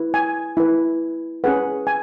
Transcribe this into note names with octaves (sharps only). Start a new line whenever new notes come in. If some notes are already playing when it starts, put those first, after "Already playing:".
Already playing: E4 B4
G#5
E4 B4
C#4 G#4 B4 F#5
G#5